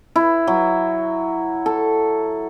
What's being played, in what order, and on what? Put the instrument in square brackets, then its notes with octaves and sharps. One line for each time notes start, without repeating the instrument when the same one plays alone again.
[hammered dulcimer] E4
F#3
A4